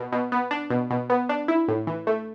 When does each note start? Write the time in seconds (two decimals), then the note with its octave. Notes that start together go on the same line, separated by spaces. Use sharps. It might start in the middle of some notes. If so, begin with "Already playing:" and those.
Already playing: B2
0.12 B2
0.32 B3
0.51 D4
0.70 B2
0.90 B2
1.10 B3
1.29 D4
1.48 E4
1.68 A2
1.87 E3
2.07 A3